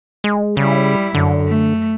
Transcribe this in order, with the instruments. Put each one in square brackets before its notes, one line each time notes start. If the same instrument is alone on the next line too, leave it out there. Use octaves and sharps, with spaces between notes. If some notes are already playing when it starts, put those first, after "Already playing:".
[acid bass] G#3
[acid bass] C#3 [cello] G3 E4
[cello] F#2 [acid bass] D3
[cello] A3